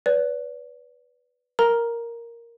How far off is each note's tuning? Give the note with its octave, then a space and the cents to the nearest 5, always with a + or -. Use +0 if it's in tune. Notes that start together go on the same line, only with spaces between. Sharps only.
B4 +0 D5 -40
A#4 +0 A#5 +10